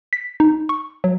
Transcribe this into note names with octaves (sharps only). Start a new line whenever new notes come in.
B6
D#4
C#6
F#3